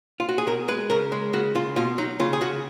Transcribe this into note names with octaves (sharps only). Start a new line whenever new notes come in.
F4
F#4
G#4
B2 A#4
G#3 B4
C#3 A#4
G#3
C#3 F#4
C#3 F4
B2 F4
F#3 D#4
C#3 F4
G#4
C#3 F#4